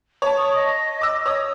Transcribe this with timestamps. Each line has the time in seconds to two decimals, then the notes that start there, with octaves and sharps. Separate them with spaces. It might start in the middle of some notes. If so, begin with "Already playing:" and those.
0.22 C#5 A5
0.37 C#6 D#6
0.55 D#5
1.01 D6 E6
1.26 C#5 D#6